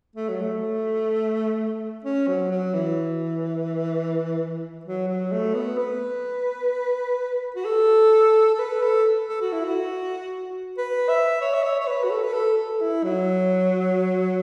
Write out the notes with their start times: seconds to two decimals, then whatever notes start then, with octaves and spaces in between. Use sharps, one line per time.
0.16 A3
0.29 F#3
0.42 A3
2.04 C#4
2.28 F#3
2.51 F#3
2.74 E3
4.85 F#3
5.08 F#3
5.32 A3
5.54 B3
5.78 B4
7.56 F#4
7.65 A4
8.54 A4
8.59 B4
8.83 A4
9.29 A4
9.41 F#4
9.52 E4
9.64 F#4
10.78 B4
11.09 E5
11.41 C#5
11.54 E5
11.63 C#5
11.80 C#5
11.87 B4
12.04 F#4
12.10 A4
12.23 B4
12.33 A4
12.57 A4
12.81 E4
13.04 F#3